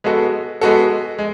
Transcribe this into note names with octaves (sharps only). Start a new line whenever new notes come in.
G#3 B3 F#4 A4
G#3 B3 F#4 A4
G#3